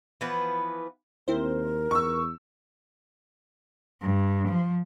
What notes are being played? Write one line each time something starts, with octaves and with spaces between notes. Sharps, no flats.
E3 F3 B3 B4
D#2 C4 E4 A#4 C5
E2 C#6 E6
G2
F3